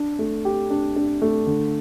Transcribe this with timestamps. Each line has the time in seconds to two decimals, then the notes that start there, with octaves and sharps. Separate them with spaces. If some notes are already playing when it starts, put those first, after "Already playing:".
Already playing: D4
0.19 A3
0.45 G4
0.70 D4
0.96 D4
1.22 A3
1.47 D3